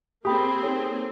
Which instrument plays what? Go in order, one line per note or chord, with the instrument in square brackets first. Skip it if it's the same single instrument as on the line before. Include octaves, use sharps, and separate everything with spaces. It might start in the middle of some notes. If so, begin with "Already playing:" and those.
[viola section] A#3 C4 G#4 [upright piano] G4 [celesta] B5 D#6
[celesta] D#4 A4 C#5